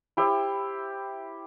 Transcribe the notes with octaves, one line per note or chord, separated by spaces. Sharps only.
E4 G4 C5 E5